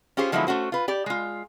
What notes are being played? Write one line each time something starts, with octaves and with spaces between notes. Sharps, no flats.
C#4 F4 G4 G#4 C5
D3 F3 F#3 G#3 B3 E4
A3 C#4 F#4 C5
F4 B4
G4 D5
G#3 F4